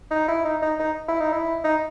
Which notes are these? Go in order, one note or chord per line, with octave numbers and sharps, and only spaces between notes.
D#4
E4
D#4
D#4
D#4
E4
D#4
E4
D#4